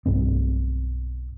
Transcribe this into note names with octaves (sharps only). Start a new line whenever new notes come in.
B1 G2 B2 C4